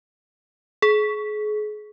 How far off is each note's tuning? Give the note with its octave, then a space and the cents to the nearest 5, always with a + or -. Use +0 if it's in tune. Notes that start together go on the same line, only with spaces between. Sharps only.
G#4 +35